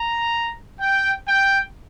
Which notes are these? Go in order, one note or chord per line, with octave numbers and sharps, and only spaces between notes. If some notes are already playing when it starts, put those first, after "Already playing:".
Already playing: A#5
G5
G5